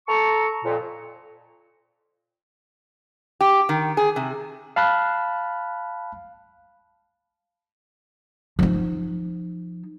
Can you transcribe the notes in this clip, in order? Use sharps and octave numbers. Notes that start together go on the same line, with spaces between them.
A4 A#5 C#6
F2 A#2
G4
D#3
G#4
C3
F5 A5 B5 F6 F#6
F3 D#4